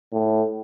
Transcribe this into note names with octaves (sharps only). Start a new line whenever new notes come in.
A2